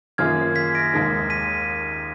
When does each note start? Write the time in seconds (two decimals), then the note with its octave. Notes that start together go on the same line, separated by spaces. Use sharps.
0.18 F#2 D#3 A#3 F4 G#4 F6 G#6
0.55 G#6 B6
0.75 A#6 D7
0.93 D#2 D#3 G#3 D#4
1.30 B6 D#7